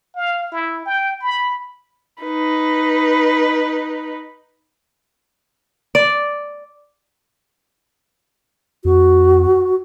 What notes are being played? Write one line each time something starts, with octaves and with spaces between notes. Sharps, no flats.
F5
E4
G5
B5
D#4 B4
D5
F2 F#4